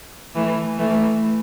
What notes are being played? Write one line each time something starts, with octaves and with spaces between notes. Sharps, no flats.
E3 A3
E3 A3